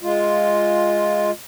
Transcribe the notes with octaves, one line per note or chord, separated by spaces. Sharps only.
G#3 F4